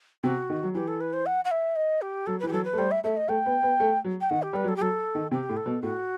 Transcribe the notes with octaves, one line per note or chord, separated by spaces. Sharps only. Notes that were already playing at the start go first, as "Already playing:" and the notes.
C3 F#4
D#3
F#3
E3 G4
A4
B4
C5
F#5
F#5
E5
D#5
G4
F#3 A4
E3 B4
G4
F#3 A4
B4
A3
G3 C5
E5
A3 E5
D#5
A3 G5
B3
B3
A3
F#3
G5
D#3 F#5
G4
G3 B4
F#3
A4
G4
F#3 A4
D#3
C3 G4
A2
A4
B2
A2 F#4